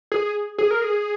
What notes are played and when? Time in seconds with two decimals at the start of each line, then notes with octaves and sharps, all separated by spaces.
0.12 G#4
0.58 G#4
0.71 A#4
0.82 G#4